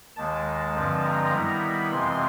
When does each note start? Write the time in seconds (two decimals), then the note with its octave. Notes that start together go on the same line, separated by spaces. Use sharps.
0.16 D#2 D#3 G#3 A5
0.75 G2 D3 F3 G#3 C4
1.04 A#5
1.33 D#3 G3 B3 E4
1.62 B5
1.91 F2 C3 E3 G#3 C4 C6